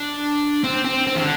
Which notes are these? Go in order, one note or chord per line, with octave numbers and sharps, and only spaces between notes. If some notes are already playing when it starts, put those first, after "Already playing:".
Already playing: D4
C4
C4
C4
E3
D3